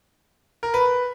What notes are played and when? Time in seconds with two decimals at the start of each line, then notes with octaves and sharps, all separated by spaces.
0.63 A#4
0.74 B4